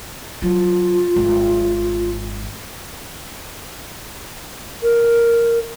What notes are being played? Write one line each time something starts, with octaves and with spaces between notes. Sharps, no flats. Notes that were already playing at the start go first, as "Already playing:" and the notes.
F#3 F4
G#1
A#4